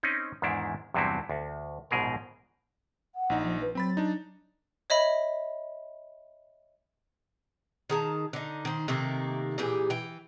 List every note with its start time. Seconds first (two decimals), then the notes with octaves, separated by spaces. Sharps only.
0.03 C4 C#4 D#4
0.42 E2 G#2 D#3 D4 E4
0.94 E2 G2 C3 F#3 C4 E4
1.30 D2
1.91 A#1 G#2 B2 G#4 A#4
3.15 F#5
3.30 A#1 D#4
3.44 F3
3.61 B4
3.75 F#3 C4 B5 A6
3.97 D4 D#4
4.90 C#5 D#5 E5 B5
7.90 D#3 G#4 A5 A#5
8.33 D3 D#4
8.65 D#3 C5
8.88 C3 D#3 A3 A#3
9.58 A#2 E3 G4 G#4
9.90 E3 G5